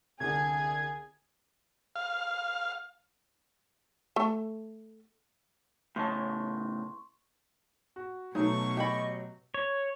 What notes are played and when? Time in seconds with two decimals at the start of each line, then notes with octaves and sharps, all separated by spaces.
0.20 C2 D3 G#4 G#6
1.96 F5
4.16 A3 A4
5.96 A2 C#3 A5 C6 C#6
7.96 F#4
8.35 B2 F#3 A3 D#4 C#6
8.77 G4 D#5 B5
9.54 C#5